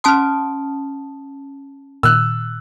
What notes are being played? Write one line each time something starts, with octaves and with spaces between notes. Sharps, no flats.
C#4 A5 C6 D#6 F6
A#2 D#3 E6 F#6